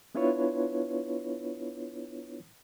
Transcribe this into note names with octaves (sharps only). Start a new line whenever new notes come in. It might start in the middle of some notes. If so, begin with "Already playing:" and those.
B3 D4 E4 F4 B4 C#5